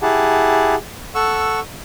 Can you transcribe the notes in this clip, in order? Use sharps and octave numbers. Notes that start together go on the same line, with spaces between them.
E4 G4 G#4 F#5 A5
A4 F#5 C#6 E6